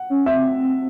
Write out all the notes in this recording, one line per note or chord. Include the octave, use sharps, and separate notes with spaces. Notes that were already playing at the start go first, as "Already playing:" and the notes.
Already playing: F#5
C#4
C4 E5